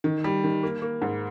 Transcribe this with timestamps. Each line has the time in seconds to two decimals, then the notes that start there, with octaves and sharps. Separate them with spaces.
0.04 D#3
0.24 G3
0.44 D#3
0.63 A#3
0.82 A#3
1.02 G#2